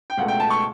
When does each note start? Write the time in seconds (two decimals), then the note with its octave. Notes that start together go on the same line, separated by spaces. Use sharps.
0.10 G5
0.17 C#2 B2 A3 F#5
0.28 G5
0.40 A5
0.50 C#6